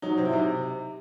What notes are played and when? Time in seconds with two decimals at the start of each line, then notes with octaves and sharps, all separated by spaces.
0.02 F#3 D#4
0.17 C3 C4
0.25 E4
0.32 C3 D#4